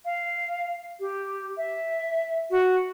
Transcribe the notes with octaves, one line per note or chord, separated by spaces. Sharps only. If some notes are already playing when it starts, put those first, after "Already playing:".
F5
G4
E5
F#4